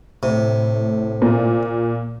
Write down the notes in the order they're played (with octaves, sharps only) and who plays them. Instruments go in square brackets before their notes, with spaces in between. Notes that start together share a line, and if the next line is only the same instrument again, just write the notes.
[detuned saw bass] A2 [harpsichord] C3
[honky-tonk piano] A#2